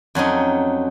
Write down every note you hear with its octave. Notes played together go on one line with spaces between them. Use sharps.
F2 F#3 C#4 D#4